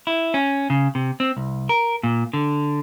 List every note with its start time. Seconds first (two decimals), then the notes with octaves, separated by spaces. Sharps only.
0.07 E4
0.34 C#4
0.70 C#3
0.95 C3
1.20 C4
1.37 C2
1.69 A#4
2.03 A#2
2.33 D3